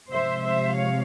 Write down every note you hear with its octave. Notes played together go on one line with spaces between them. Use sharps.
C3 F3 G#3 C5 E5
C5 E5
C#5 F5